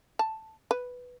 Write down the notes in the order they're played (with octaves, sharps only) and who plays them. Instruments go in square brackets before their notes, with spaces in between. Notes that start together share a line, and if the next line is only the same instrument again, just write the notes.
[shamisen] A5
B4